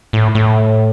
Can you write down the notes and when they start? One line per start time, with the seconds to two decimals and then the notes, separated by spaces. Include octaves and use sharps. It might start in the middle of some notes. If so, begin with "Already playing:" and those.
0.13 A2
0.35 A2